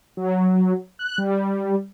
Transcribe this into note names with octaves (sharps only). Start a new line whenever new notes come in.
F#3
F#6
G3